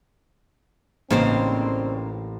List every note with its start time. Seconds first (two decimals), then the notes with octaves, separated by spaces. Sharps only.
1.10 A1 C#3 G3 A#3 C4 C#4 D#4 C5